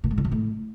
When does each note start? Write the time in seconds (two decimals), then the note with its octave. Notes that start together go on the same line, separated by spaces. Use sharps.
0.04 A#2
0.11 G#2
0.18 D3
0.25 F3
0.32 A2